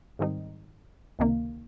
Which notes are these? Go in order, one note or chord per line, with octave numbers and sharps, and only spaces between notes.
G#2 D#3 G3 C4 D#4
C#2 C3 D#3 A#3